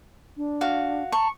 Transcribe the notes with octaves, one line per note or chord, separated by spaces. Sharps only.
D4
F#4 F5
A5 A#5 C#6